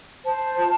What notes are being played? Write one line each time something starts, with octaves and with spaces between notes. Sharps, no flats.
C5 A5
F4